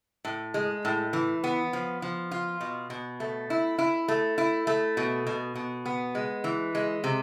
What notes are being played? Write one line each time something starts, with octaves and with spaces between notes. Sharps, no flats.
A2
G#3
A2
E3
B3
F3
F3
F4
B2
B2
A3
E4
E4
A3
E4
A3
B2
B2
B2
B3
G#3
E3
G#3
C3